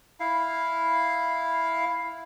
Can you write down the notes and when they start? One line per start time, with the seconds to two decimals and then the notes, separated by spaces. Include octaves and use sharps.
0.20 E4 F5